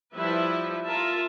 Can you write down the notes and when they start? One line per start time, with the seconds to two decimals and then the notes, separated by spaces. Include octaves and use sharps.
0.15 F3 G3 E4 B4 E5
0.88 F4 A#4 E5 A5